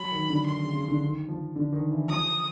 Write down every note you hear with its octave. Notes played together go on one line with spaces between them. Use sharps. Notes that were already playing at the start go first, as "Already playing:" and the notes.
Already playing: F#3 B5
D#3
D3
D#3 C6
C#3
C#3
D3
D#3
F3
D3
D#3
E3
F3 D#6